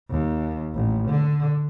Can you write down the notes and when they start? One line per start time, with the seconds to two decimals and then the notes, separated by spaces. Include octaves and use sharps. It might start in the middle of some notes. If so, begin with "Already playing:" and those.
0.10 D#2
0.75 A1
1.09 D3